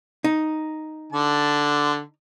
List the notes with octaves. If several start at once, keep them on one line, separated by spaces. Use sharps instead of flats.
D#4
D3 A5